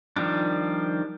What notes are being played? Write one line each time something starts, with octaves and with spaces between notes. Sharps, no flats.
D#3 F3 G3 D4